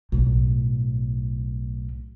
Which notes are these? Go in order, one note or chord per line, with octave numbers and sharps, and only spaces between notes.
B1 A2